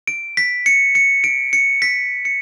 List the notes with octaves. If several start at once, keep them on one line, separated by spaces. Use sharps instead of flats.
D7
B6
C#7
C#7
D7
C#7
B6
C#7